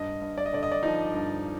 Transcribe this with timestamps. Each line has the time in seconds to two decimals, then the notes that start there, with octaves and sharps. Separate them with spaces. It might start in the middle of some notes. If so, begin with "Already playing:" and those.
Already playing: G2 D#5
0.21 G2
0.38 D5
0.46 D#5
0.53 D3 D5
0.63 D#5
0.72 D5
0.83 F3 D#4
1.13 G2